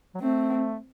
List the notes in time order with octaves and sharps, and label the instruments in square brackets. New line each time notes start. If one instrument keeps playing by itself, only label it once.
[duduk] F#3
[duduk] A3 [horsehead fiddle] C4